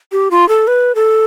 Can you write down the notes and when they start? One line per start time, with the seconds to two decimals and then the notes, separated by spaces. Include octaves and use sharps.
0.12 G4
0.31 F4
0.49 A4
0.67 B4
0.95 A4